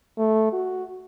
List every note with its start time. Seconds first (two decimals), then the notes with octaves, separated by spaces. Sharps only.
0.18 A3
0.53 F#4